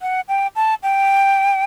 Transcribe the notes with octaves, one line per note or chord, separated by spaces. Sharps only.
F#5
G5
A5
G5